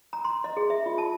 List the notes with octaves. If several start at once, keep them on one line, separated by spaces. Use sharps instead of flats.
A#5
C6
D#5
G#4
E5
F4
A5